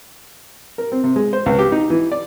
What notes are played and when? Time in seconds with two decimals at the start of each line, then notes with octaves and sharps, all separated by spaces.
0.78 A#4
0.92 C4
1.04 C3
1.16 G#3
1.33 C5
1.46 C#2
1.59 G4
1.72 D#4
1.90 E3
2.12 D5